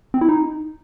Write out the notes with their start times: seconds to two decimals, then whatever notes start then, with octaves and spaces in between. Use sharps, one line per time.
0.14 C4
0.21 E4
0.29 D#4